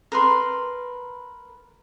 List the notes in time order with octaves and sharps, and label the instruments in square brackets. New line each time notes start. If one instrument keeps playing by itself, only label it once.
[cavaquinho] A#4 B4 C6